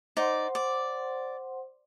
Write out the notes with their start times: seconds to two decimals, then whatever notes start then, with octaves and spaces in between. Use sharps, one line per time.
0.17 D#4 C5 D5 F#5 C6
0.55 D5